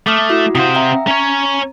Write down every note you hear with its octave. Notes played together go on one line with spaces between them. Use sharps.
A3 D6 D#6 F6
E4 F#4
C3 C5 F5 F#5 D#6
E5 G5 A#5
C#4 C#5 A#5